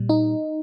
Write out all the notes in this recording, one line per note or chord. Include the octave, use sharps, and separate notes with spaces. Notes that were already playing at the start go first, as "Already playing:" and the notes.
Already playing: A#2 G3
D#4